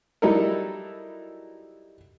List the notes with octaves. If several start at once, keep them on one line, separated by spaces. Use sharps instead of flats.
F#3 G3 D#4 E4 A4 A#4